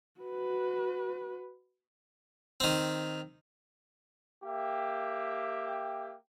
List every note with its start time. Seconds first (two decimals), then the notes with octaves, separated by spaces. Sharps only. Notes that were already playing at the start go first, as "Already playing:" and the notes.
0.21 F#4 B4
2.60 D#3 C4
4.43 A#3 G4 E5 G5